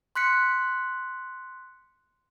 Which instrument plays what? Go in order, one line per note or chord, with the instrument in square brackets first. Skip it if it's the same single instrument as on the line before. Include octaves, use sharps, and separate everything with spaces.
[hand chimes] C6 F#6 B6 C#7